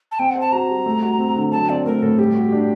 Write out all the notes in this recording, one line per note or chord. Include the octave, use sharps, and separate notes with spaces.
A5
C4 G5
F#5
C5
A5
F#4 A#5
G3
A3
F#4
C4
D3
F#3 A5
C4 D5
A3 A#4
A2 A4
G3 G4
F#4
D4